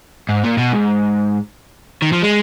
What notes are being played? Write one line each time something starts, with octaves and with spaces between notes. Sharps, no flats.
G#2
A#2
B2
G#2
D#3
F3
G#3